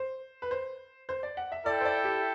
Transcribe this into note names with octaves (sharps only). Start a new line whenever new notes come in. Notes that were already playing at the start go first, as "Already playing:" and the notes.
Already playing: C5
B4
C5
C5
D5
F#5
E5
E4 A4 D5 E5 G5
C5
D5
G4